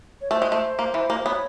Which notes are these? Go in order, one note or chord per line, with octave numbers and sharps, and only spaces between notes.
C#5
A3 C5
G#3
A3
A#3
E3
A#3
C5
B3 C#5